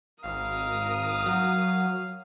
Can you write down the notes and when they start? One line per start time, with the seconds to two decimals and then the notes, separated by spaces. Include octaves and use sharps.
0.24 G#1 A#4 F5 D#6
1.26 F#3